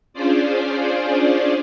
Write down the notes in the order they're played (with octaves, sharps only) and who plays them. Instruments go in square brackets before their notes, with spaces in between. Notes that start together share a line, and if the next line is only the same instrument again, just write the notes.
[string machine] C#4 D4 F4 G#4 C5 D5